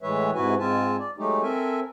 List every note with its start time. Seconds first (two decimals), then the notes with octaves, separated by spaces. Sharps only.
0.02 A2 E3 G#3 B4 C#5 E5
0.34 G#2 C3 E4 F#4 B4 G#5
0.59 G#2 G#3 C4 F4 G#5 A5
0.99 D5
1.17 F#3 G#3 A3 D#4 G4
1.42 C4 A4 A#4 E5 G#5